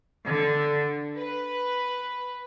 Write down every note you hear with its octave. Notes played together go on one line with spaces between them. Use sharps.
D3
B4